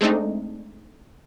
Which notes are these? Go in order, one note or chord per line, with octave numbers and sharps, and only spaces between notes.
G#3 A3 C4 D4 D#4